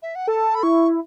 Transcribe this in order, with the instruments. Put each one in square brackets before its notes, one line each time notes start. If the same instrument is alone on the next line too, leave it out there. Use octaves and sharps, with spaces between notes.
[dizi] E5
F#5
[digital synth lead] A4 [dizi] A5
[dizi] B5
[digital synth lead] E4 [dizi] C#6